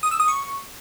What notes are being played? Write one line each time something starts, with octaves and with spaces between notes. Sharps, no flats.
D#6
E6
D#6
C#6